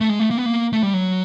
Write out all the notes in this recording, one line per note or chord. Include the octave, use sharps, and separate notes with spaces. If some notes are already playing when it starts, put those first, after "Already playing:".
A3
G#3
A3
A#3
B3
A#3
A3
G3
F#3